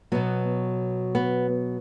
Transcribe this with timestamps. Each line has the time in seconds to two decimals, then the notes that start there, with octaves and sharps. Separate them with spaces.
0.12 B2 F#3 B3
1.15 B3